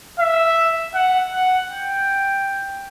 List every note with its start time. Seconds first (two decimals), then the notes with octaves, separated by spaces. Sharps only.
0.19 E5
0.94 F#5
1.32 F#5
1.70 G5